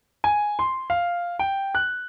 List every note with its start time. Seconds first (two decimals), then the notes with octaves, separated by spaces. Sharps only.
0.24 G#5
0.59 C6
0.90 F5
1.39 G5
1.75 F#6